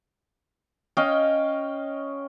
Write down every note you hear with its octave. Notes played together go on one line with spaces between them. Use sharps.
C#4 D#5 F5 G5